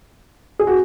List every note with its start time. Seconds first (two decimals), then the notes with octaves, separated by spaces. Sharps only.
0.59 G#4
0.67 F#4